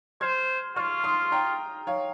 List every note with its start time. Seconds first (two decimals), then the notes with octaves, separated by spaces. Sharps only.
0.21 C5 F6 G#6
0.76 F4 C#6 F6
1.04 C6 D#6
1.32 G5 A#5
1.87 C#5 F5